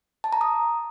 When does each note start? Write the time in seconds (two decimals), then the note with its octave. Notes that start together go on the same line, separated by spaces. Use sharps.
0.24 A5
0.33 A#5
0.41 D#6